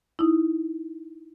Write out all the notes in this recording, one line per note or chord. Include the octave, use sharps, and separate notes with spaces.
D#4 E4